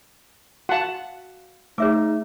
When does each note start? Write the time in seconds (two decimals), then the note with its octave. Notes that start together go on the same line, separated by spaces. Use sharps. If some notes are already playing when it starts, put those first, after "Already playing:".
0.69 F#4 F5 F#5 A5
1.78 A3 D#4 G#4 C#5 E5 D6